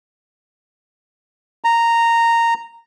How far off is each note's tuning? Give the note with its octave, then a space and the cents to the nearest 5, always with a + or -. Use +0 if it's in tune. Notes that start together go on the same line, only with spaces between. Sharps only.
A#5 -10